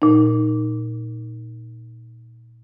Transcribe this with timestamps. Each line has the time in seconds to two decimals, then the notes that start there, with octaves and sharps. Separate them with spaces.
0.02 A#2 D#4